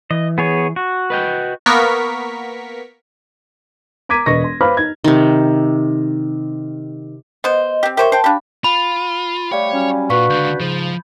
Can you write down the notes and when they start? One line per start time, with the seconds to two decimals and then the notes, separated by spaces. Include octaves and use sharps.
0.11 E3 D#5
0.38 B3 G#4 C#5
0.76 F#4
1.10 B4 D#5 G5
1.66 A#3 B3 A#4 C#6 B6
4.09 A#5 D6 G#6 B6 D#7
4.26 E1 B4 D#5 C#6 A#6
4.44 C6
4.61 B4 C5 F5 B5 D6 F6
4.77 D#4 G#6
5.04 C3 D#3
7.44 B3 C5 D#5
7.83 C4 G4
7.97 G4 A#4 C5 C#5 E5
8.12 C5 G5 A5
8.24 D4 G4 F5 B5
8.64 F4 B5
9.52 G3 A3 C#5 D5 F5 G5
9.72 F#3 G3 C#4
10.10 A#2 D4 F#4 B4 F5 C#6 B6
10.30 C#2 D3 G6
10.60 G#2 C#3 F3